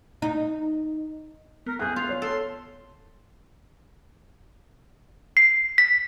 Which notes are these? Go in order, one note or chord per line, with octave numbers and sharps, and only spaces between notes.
D#4
B3 A#4
G#4 F#6 G6
F4 F5
C#5
A4 C6
C7
B6